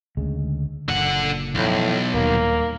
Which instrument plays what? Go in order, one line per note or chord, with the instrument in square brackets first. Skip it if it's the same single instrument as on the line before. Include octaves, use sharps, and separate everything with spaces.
[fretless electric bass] D2 C#3 G#3
[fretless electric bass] F#1 A#2 [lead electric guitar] D3 F#5
[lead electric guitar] B1 [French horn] A2 [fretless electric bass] E3 F3
[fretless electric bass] D#1 [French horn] A#3